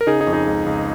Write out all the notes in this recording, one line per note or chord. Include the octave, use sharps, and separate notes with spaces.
A#4
C#3 D#4 G#4
D#4 G#4
F2
D#4 G#4
C#2
C#2